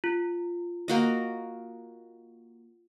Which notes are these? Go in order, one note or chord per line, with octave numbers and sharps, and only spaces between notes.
F4
A#3 F#4 D#5